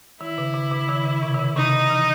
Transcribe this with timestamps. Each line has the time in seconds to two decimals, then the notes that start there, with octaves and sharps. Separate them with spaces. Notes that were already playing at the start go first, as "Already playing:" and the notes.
0.21 D#3 E4
0.38 C#3
0.54 C#3
0.72 C#3
0.89 D#3
1.06 C#3
1.23 C3
1.35 D#3
1.39 C#3
1.56 C3 D#4
1.90 E3